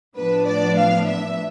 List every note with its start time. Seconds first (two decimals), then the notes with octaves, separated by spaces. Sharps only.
0.17 A2 F3 B3 D4 B4
0.47 D5
0.77 F5
1.07 E5